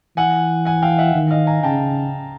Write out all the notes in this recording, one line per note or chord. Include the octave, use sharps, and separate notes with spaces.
E3 F#5 G#5
F#5 G#5
F5 G5
E5 F#5
D#3
D#5 F5
G#5 A#5
C#3 G5 A5